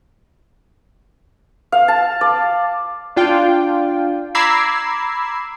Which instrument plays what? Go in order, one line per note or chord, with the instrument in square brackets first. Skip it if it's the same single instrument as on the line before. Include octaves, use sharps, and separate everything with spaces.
[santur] F5
A5
D5
[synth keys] D4 F4 G5
A#5 B5 D6 E6 G#6 C7